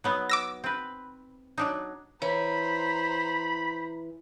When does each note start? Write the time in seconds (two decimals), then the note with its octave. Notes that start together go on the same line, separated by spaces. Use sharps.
0.04 F#3 B3 D#4
0.29 D6 E6 A#6
0.64 C4 B4
1.58 F#3 D4 D#4
2.22 E3 C5 C#5 A#5 B5